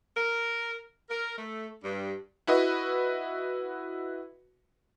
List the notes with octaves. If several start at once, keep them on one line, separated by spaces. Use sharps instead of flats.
A#4
A#4
A3
G2
E4 F#4 B4 D#5